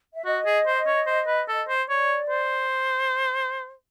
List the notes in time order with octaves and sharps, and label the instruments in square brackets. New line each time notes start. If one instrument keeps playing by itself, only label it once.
[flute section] E5
[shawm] F#4 [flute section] D#5
[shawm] G#4
C5
C#5
C5
B4
A4
C5
[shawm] C#5 [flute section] D5
[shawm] C5